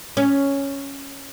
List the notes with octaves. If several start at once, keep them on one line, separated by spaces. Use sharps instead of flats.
C#4